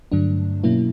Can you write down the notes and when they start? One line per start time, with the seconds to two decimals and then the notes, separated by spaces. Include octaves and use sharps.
0.12 G2 D3 F#3 A3 D4
0.63 B2 F#3 A#3 C#4 E4